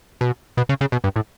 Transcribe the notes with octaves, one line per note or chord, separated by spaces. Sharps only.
B2
B2
C#3
C#3
B2
G2
A2